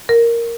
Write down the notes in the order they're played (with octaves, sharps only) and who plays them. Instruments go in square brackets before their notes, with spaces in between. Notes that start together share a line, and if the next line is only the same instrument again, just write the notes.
[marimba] A#4